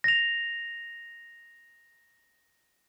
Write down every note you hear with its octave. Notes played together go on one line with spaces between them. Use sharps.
A#6 F7